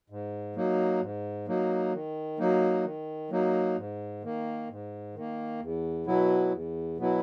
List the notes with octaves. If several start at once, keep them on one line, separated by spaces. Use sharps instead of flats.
G#2
F#3 A#3 D#4
G#2
F#3 A#3 D#4
D#3
F#3 A#3 D#4
D#3
F#3 A#3 D#4
G#2
D#3 A#3
G#2
D#3 A#3
E2
B2 F#3 B3 E4
E2
B2 F#3 B3 E4